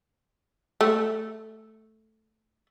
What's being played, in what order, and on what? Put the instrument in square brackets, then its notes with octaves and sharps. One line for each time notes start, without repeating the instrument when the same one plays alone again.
[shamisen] A3